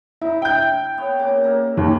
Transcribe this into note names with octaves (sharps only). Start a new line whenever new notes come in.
D#4 E4
E5 G5 G6
B3 C#5
A#2 C#3 D6
A#3 A4
D#2 C#4